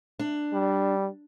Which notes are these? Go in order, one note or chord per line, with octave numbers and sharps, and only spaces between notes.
D4
G3